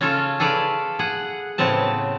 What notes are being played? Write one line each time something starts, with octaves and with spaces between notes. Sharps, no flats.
C#3 C#4 F4 A4
G#4 A4 B4 D5 F5
G#4 F#5
A2 C#3 B3 C4 A5